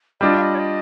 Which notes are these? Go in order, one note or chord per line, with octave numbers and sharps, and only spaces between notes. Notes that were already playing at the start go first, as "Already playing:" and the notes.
G3 D4 F4 D#5
F5
D#5
C#5
D#5